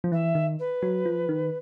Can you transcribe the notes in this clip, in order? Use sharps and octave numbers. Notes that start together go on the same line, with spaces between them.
F3
E3 E5
D#3
B4
F#3
F3
D#3